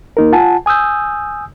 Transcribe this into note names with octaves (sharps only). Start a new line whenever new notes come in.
A#3 D#4 A#4
F4 F#5 G#5 A5
G#5 D#6 E6 G6